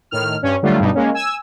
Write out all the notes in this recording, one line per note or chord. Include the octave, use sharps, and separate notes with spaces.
A2 D#3 F6
G2 C#4
D3 F#3 G3 A3 F4
G2 B2 G3 D#4
G#3 A#3 C#4
G#5 E6